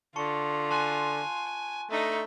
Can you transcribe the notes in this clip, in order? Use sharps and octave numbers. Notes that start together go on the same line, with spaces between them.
D3 F4 A5 C#6 C#7
G#5 A5 C6 F#6
A3 D4 D#4